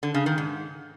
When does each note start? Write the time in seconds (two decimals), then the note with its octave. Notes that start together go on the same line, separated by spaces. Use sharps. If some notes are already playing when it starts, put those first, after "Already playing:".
0.03 D3
0.14 C#3
0.26 D#3
0.38 G#2